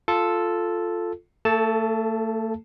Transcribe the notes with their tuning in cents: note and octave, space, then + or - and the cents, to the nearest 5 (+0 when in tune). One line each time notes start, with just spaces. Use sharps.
F4 +0 A4 +0
A3 +35 A4 -15 A5 +0